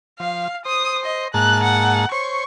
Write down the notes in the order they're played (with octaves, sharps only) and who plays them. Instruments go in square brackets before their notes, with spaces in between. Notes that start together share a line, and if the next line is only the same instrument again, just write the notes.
[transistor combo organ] F3 [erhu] F5
[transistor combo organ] C5 [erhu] D#6
[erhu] D#5
[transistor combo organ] G#2 A#3 A5 [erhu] F#6
[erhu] F#5
[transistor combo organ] C5 C#5 [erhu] C#6